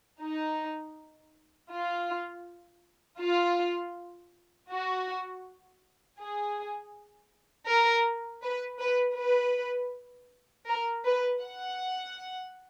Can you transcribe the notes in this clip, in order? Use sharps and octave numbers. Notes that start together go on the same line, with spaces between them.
D#4
F4
F4
F#4
G#4
A#4
B4
B4
B4
A#4
B4
F#5